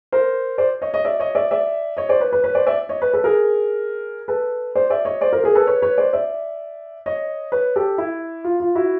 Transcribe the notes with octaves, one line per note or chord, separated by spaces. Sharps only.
A#4 C5
C5 D5
C#5 D#5
C#5 D#5
D5 E5
C#5 D#5
D5 E5
D5 E5
C#5 D#5
C5 D5
B4 C#5
B4 C#5
B4 C#5
C5 D5
D5 E5
C#5 D#5
B4 C#5
A4 B4
G#4 A#4
A4 B4
C5 D5
D5 E5
C#5 D#5
C5 D5
A#4 C5
G#4 A#4
A4 B4
B4 C#5
B4 C#5
C5 D5
D5 E5
C#5 D#5
B4 C#5
G4 A4
E4
F4
F4
E4 F#4